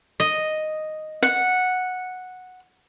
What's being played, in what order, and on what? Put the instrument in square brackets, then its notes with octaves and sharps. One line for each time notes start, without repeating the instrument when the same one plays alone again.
[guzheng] D#5
[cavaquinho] F#5